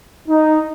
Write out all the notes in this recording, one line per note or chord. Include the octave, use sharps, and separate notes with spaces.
D#4